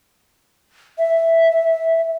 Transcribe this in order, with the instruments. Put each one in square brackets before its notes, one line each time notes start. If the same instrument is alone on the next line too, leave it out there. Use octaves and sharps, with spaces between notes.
[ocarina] E5